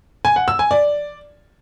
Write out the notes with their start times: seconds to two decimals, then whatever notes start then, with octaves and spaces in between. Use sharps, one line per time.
0.25 G#5
0.36 F#5
0.48 E6
0.59 G#5
0.71 D5